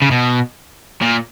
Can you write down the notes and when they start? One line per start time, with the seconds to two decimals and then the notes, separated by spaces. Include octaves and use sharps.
0.02 C#3
0.11 B2
1.02 A#2